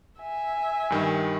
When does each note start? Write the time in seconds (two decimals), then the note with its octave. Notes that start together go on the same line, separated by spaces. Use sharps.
0.19 E5 G#5
0.90 G2 D#3 G3